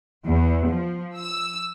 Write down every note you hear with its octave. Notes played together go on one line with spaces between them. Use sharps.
E2
F3
E6